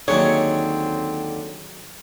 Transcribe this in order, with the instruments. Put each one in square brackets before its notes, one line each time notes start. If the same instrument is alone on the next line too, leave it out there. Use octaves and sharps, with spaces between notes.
[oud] D#2 D3 [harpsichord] D#3 F#3 G#4 [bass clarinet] C4 [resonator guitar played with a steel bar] C#5